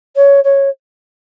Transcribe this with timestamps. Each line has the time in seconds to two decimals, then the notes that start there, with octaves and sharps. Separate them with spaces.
0.16 C#5
0.44 C#5